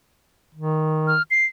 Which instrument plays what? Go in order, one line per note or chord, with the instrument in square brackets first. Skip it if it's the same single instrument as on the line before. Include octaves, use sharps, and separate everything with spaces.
[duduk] D#3
[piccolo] F6
C7